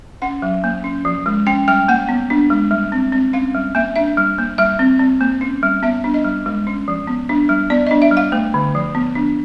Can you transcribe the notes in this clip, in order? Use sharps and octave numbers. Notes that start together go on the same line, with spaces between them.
C#4 F#5
F#3
A#3
C#4
F3
G#3
C#4 G5
G3 G5
A#3 F#5
B3
D4
G#3
G3
C4
C4
C#4 F5
G3
A#3 E5
D4 E5
G3
A#3
G3 E5
C4
C4
A#3
C#4
G3
B3 E5
D4
D#5
G3
G#3
C#4
F3
B3
D4
G3
B3 D5
D4 D#5
E5
G3
F5
A3
D3
F3
B3
D4